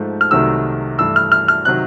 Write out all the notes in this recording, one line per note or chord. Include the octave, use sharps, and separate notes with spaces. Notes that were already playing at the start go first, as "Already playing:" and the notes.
Already playing: G#2 F3 A3
F6
C2 C3 D#3 F#3 A3 E6
G2 E3 A3 E6
F6
F6
F6
C3 D#3 F#3 F#6